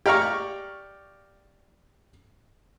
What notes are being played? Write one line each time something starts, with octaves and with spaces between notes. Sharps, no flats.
G4 D5 F5 A#5 C#6